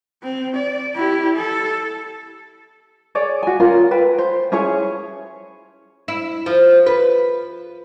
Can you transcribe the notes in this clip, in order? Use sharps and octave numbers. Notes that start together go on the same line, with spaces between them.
C4
D5
E4 G4
A4
G#4 C#5 D5
F#4 G#5
C#4 F4 A#4
B4 G5
C5
C#4 E4 G#4 C#5
E4
F3
B4